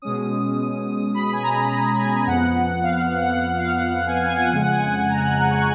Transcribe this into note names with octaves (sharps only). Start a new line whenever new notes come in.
B2 G#3 C#4 D#6
B5
G#5
A#5
A#5
G#5
F2 F3 B3 F#5
F5
F5
F#5
F#5
F5
F#5
F#5
G#5
F#5
G#5
F#5
F2 C#3 G#3 G#5
F#5
G#5
F#5
A#5
F#6
C#6